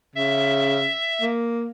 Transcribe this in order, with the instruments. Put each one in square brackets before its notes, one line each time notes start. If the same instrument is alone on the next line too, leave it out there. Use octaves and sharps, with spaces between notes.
[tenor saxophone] C#3 [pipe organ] E5
[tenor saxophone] A#3